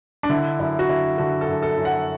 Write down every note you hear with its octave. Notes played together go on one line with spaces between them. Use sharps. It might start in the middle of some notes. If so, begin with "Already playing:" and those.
D4
D3 E4
F#2 E4
F#4
D3 E4
D3 F#4
A4
F#2
A4
F#2
F#5